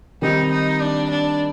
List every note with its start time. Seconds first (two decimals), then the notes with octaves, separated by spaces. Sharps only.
0.22 D#3 G3 C4 D#4
0.52 D#4
0.81 D4
1.10 D4